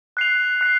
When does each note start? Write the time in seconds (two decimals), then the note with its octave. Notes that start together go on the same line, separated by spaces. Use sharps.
0.17 F#6 C7 F7
0.61 F#6 C7